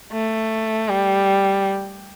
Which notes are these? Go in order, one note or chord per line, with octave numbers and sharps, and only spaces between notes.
A3
G3